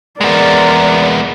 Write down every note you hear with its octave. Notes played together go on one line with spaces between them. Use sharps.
G#3 B3 A#4 D5